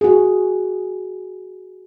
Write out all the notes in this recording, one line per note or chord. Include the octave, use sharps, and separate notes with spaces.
F#4 G#4